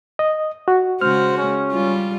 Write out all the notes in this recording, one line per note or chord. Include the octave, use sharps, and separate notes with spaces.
D#5
F#4
C#3 G#3 F#4 C5 F6
C#4
G3 F4